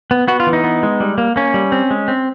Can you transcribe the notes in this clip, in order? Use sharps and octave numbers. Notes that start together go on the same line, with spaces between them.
B3
B3 F#4
F4
E3
D#4
B3
G#3
G3
A#3
A#3 C#4
G3
C4
G#3
C4